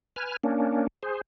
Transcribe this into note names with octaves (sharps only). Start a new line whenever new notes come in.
B4 G#5 F6
A#3 C#4 D4
G#4 C5